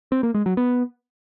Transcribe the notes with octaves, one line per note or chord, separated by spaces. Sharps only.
C4
A#3
G#3
F#3
B3